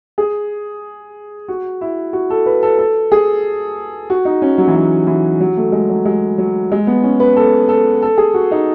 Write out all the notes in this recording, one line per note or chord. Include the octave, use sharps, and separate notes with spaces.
G#4
F#4
E4
F#4
A4
B4
A4
A4
G#4
F#4
D#4
C#4
F#3
E3
F#3
E3
F#3
A3
G#3
F#3
G#3
F#3
G#3
B3
C#4
B4
A4
A4
A4
G#4
F#4
D#4